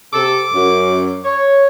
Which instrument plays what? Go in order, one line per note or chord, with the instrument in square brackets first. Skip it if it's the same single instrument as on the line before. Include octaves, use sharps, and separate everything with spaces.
[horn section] C3 A4 [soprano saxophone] D6
[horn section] F#2
C#5